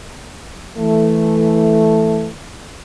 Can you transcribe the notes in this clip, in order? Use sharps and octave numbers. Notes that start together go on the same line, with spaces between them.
E3 A3